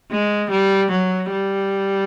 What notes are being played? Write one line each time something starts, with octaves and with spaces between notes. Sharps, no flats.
G#3
G3
F#3
G3